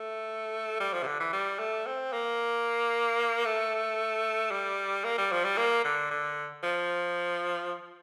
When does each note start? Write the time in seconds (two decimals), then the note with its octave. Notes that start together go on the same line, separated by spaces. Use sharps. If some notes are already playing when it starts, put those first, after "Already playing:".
Already playing: A3
0.80 G3
0.93 F3
1.03 C3
1.07 D3
1.20 E3
1.33 G3
1.59 A3
1.87 C4
2.13 A#3
3.45 A3
4.51 G3
5.04 A#3
5.18 G3
5.32 F3
5.44 G3
5.58 A#3
5.84 D3
6.11 D3
6.63 F3